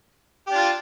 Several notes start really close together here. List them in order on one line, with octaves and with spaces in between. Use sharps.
G4 D4 F4